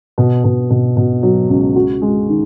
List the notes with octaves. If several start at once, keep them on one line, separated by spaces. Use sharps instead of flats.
B2
B2
B2
B2
F#3
C#2
F#4
G#3
D#3